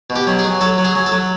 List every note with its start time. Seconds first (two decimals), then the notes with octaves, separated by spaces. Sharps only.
0.10 B2
0.16 G4
0.27 F#3
0.39 G#4
0.44 F#3
0.61 F#3 A4
0.78 F#3
0.85 G#4
0.95 F#3
1.06 A4
1.12 F#3